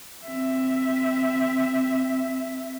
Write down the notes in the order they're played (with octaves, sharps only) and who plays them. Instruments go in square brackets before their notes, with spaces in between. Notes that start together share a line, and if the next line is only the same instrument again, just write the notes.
[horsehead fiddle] C4 E5